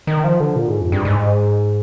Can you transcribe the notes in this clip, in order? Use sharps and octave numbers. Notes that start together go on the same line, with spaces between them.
D#3
F3
D3
A#2
G#2
F2
G2
G#2